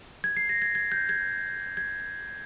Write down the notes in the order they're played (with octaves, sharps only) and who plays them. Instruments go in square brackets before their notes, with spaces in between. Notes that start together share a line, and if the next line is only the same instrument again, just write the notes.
[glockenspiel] G#6
C7
A#6
G#6
G#6
G6
G#6
G#6